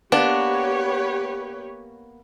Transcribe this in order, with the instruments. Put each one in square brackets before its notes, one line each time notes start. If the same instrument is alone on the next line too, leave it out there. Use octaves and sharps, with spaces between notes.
[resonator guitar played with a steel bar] A#3 B3 [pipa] D4 [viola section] G4 B4 C#5